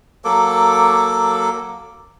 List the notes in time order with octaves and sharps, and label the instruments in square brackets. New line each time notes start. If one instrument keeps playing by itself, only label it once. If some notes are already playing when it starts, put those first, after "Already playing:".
[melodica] F#3 A#3 A4 D6